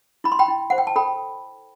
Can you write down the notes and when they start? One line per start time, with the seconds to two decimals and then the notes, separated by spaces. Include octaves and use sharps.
0.24 E4 B5
0.32 C6
0.39 G5 B5
0.48 E4
0.70 C5 F#5
0.78 G5
0.87 A5
0.96 A4 G5 B5